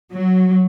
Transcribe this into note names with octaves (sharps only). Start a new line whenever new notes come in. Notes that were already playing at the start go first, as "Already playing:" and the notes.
F#3